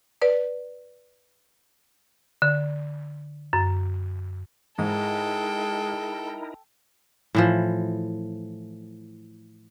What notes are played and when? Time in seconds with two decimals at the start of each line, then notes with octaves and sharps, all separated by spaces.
0.22 B4 D5
2.42 D3
3.53 F#2
4.79 G#2 G#3 D#4 E4 A4 A#4 G5
7.35 A2 E3 F3